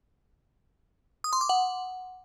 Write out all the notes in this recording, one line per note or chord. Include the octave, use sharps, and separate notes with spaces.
D#6
C6
D6
F#5